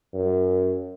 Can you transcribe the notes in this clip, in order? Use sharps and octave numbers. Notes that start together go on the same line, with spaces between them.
F#2